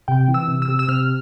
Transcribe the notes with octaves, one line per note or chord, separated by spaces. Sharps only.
C3 G5
E3
E6
C3
E6
C3
E6
C3 F6